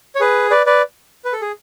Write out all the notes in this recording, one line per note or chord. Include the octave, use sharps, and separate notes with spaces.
C#5
G#4 B4
B4 D5
B4 D5
B4
A4
G#4